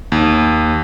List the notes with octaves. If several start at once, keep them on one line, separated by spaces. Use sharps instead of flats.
D#2